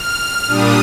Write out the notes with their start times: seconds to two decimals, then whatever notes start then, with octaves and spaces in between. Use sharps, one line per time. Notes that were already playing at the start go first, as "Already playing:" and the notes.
Already playing: F6
0.47 A#2 G3 D4 D#6